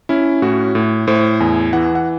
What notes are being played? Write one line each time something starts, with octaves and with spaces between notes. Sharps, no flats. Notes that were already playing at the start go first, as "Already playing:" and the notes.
C#4 E4
A2 F#4
A2
A2 C5
E2 G#5
E3 F#5
F#5